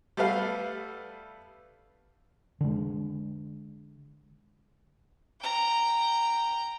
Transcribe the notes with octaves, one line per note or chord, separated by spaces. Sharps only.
G3 A3 B3 A4 B4 F5
D3 G#3
G5 A#5